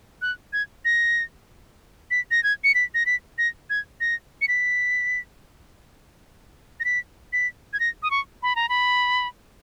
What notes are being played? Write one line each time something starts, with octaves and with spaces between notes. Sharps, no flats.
F#6
G#6
A#6
B6
A#6
G#6
C#7
B6
A#6
B6
A#6
G#6
A#6
C#7
B6
A#6
B6
B6
G#6
A#6
D#6
C#6
B5
A#5
B5